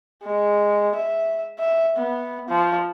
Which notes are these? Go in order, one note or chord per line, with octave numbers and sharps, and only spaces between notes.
G#3
E5
E5
B3
F3